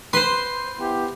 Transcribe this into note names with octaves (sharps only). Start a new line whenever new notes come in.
B4 C5 C6
B3 E4 G4